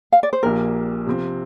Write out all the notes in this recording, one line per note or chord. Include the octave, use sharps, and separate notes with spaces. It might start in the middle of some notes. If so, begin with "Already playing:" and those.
F5
D5
C5
A#1 A#2 A#3 G4 A#4
C3 F3 C4